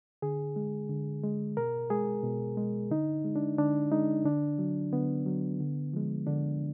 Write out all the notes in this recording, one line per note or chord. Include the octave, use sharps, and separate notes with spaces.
D3 G#4
G#3
D3
G#3
B2 A#4
G#3 G#4
B2
G#3
D3 D#4
G#3
D4
D3 D4
G#3 D#4
D3 D4
F#3
D3 B3
F#3
D3
F3 G#3
D3 D4